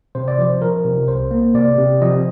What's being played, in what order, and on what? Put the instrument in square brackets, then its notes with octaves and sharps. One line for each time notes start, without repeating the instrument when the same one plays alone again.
[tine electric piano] C3 C5
D5
F3 C5
F3 A#4
C3
C2 C5
A#3
C3 D5
C3
F3 D#5